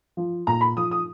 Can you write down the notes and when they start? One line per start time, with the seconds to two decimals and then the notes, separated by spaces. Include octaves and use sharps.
0.17 F3
0.47 A#2 A#5
0.61 B5
0.77 F3 D#6
0.91 D#6